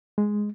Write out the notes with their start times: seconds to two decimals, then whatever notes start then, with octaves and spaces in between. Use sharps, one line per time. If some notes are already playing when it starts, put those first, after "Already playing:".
0.18 G#3